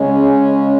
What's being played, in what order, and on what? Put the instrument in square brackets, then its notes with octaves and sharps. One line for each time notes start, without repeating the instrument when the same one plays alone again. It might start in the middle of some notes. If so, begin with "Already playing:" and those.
Already playing: [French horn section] C#3 G#3 C#4